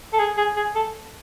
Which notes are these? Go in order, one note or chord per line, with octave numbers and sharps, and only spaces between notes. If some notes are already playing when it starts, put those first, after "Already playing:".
A4
G#4
G#4
G#4
A4